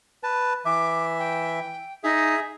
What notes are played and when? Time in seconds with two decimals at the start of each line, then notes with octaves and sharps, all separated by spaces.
0.23 B4 A5
0.65 E3 E5 D6
1.19 G5
2.04 D#4 G#4 E5